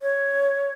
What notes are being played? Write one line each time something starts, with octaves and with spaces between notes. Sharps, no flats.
C#5